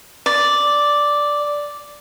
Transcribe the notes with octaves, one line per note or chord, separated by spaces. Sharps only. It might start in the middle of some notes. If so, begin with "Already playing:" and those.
D5